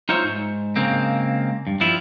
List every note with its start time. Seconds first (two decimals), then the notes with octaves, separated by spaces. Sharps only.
0.09 D#4 F4 C5 C#5 E5
0.24 G#2
0.76 C#3 G#3 A#3 C4
1.67 G2
1.80 F3 G3 E4 F4